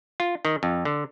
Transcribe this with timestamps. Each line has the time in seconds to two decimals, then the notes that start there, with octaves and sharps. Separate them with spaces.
0.20 F4
0.45 D#3
0.63 F2
0.85 D3